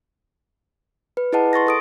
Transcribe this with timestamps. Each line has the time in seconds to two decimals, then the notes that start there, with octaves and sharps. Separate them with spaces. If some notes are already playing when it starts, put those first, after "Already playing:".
1.17 B4
1.33 E4 G#4 B4 D#5 F#5 A5
1.53 C6 C#6 A6 A#6
1.67 A4 D#6 D7